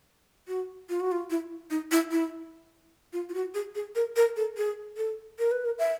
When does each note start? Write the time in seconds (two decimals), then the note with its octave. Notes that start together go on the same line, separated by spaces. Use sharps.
0.48 F#4
0.89 F4
1.00 F#4
1.12 F4
1.30 E4
1.70 D#4
1.91 E4
2.11 E4
3.13 F4
3.29 F4
3.34 F#4
3.54 G#4
3.75 G#4
3.95 A#4
4.16 A#4
4.36 A4
4.57 G#4
4.97 A4
5.39 A#4
5.51 B4
5.65 A#4
5.79 E5